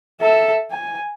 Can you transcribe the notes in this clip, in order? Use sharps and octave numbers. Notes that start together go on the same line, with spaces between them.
A4 E5
G#5